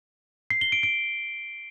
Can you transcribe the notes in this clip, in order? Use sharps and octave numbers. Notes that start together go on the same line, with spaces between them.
C7
G7
D7
D7